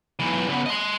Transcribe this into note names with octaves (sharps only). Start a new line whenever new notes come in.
B1 E3
C#3 B3
D#5 C6